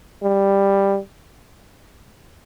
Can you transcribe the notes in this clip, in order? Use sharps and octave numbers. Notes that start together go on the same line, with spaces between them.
G3